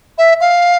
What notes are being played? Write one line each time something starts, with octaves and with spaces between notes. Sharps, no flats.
E5
F5